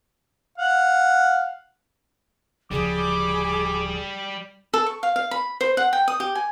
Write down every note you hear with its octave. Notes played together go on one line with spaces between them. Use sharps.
F5 F#5
D1 C#3 F3 G3 G#4 D6
A4
C#6
F5
F5
B5
C5
F#5
G5
D#6
G4
G#5